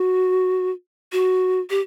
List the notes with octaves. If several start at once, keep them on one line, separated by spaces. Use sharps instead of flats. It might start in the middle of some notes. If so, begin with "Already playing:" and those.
Already playing: F#4
F#4
G4